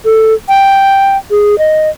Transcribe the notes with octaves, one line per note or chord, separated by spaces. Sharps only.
A4
G5
G#4
D#5